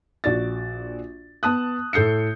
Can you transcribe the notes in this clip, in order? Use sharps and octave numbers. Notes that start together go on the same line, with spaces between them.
A#1 F#4 D5 A6
B3 A5 D#6 F#6
A2 A4 G6 C7 C#7